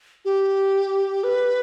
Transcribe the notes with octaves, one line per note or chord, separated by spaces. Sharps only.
G4
B4